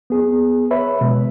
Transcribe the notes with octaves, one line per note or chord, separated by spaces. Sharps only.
B3 G#4
B4 C#5 E5 B5
B2 G#3